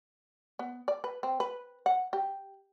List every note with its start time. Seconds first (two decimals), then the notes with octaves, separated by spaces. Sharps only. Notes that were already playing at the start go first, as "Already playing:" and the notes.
0.59 B3
0.88 D5
1.04 B4
1.23 C4
1.40 B4
1.86 F#5
2.13 G4